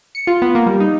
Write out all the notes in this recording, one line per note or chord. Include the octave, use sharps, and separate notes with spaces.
C#7
F4
B3
A#3
G3
D#4